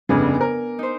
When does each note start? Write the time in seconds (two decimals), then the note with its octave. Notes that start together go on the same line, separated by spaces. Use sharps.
0.09 F1 G2 C#3 B3 D4 G#5
0.41 A#4
0.79 D#4 C5